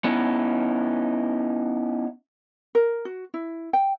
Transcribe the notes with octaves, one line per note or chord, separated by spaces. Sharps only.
B3 C#4 D#4 E4
A#4
F#4
E4
G5